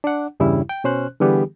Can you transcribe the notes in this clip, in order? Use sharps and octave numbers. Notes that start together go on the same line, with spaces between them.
D4 F#5
E2 G2 C#3 G3 E4
G5
B2 C#4 C5 F#6
D3 E3 G3 B3 G4 G#4